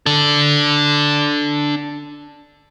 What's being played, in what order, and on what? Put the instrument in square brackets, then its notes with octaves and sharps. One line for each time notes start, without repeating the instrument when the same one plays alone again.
[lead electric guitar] D4 A4